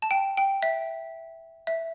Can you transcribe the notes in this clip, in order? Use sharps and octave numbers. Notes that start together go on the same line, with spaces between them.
A5
G5
G5
E5
E5